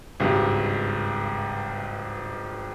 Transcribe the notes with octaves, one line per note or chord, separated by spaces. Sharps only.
G#1 C#2 G2